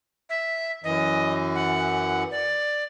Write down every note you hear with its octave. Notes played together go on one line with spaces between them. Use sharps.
E5
F#2 E3 D#5
F#5
D5